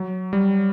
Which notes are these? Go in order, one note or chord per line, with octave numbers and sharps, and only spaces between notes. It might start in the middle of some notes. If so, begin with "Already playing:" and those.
Already playing: F#3
G3